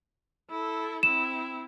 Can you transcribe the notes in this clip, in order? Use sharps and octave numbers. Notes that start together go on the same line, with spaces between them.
E4 A4
C4 E4 E7